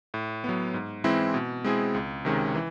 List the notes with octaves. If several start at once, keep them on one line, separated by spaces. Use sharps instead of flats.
A2
F#3 B3
G#2
E3 G#3 C4 E4
B2
G#3 C4 E4 G#4
C#2
C3 D#3 G#3 C#4
E3